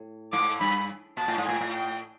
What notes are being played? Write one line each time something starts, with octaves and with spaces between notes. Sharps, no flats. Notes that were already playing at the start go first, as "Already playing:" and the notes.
Already playing: A2
G#2 D6
G2 B5
A#2 A5
A2
G#2
A2 G#5
A2
G5